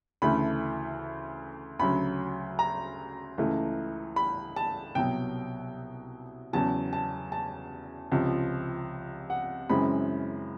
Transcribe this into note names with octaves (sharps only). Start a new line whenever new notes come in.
D2 C#3 E3 A3 B5
D2 C#3 F#3 B5
A#5
C#2 C#3 E3 A3
B5
A5
C2 B2 F#3 G5
E2 C#3 F#3 A5
A5
A5
C#2 C3 F3
F#5
F#2 C#3 E3 G#3 C4 B5